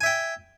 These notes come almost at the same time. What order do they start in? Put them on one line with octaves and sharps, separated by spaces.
G#5 E5 G5